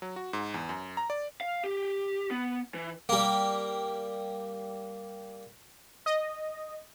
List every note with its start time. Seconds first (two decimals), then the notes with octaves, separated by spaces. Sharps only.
0.02 F#3
0.16 F#4
0.33 G#2
0.54 E2
0.69 F#2
0.97 A#5
1.10 D5
1.41 F5
1.64 G4
2.31 B3
2.74 E3
3.09 G3 A#3
6.06 D#5